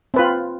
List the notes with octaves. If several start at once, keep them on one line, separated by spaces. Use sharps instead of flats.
C4 F4 B4